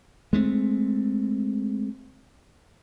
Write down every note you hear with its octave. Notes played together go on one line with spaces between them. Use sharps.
G#3 A3 B3 C4